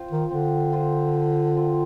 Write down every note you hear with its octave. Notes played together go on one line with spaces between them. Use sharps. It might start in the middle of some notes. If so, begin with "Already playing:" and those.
Already playing: C4 F4 C5
D#3
D3 C4
F4 C5
F3
C4 F4